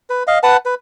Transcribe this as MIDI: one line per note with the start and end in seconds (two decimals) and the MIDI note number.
0.10 0.23 71
0.27 0.39 75
0.27 0.39 77
0.43 0.57 71
0.43 0.57 78
0.43 0.57 81
0.66 0.75 71